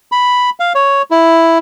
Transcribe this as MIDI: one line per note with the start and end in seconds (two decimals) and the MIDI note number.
0.12 0.50 83
0.60 0.73 77
0.75 1.02 73
1.11 1.58 64